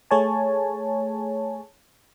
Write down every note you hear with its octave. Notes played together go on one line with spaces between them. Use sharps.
A3 G#4 C#5 G#5 A5